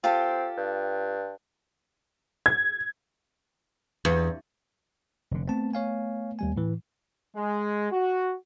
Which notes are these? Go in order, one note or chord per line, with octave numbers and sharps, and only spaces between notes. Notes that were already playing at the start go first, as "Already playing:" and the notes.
C4 F4 G4 A4
G2
G#6
E2
F1 D3
A3 B3 C4 A5
C#5 F5 G#5
D#2 G3 G#5
A2 E3
G#3
F#4